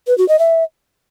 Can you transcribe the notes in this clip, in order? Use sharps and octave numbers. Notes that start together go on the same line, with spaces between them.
B4
F#4
D#5
E5